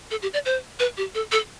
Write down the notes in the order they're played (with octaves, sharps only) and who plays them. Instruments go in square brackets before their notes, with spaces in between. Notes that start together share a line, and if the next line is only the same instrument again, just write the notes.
[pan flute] A4
G4
D5
C5
B4
G4
A4
A4